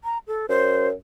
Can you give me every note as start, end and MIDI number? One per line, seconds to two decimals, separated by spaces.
0.04 0.18 82
0.27 0.46 69
0.49 0.92 42
0.49 0.88 72